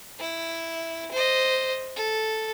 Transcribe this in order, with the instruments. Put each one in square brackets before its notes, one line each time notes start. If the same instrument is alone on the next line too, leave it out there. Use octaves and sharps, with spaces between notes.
[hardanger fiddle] E4
C5 D#5
A4